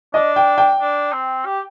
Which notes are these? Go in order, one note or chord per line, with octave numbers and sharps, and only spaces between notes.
D4 D#5
G5
G5
D4
C4
G4